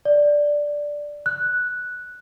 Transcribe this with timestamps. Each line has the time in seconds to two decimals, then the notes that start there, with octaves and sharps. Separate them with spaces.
0.05 D5
1.26 F#6